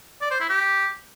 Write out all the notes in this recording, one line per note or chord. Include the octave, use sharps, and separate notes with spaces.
D5
C5
E4
G4